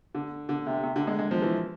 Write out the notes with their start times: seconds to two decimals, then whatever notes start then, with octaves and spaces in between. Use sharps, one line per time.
0.15 D3
0.49 D3
0.67 C3
0.83 C3
0.96 D3
1.07 G#3
1.19 G#3
1.31 F3
1.42 E3